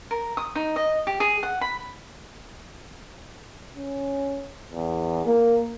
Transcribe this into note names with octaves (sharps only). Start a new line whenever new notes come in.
A#4
D#6
D#4
D#5
G4
G#4
F#5
B5
C#4
E2
A#3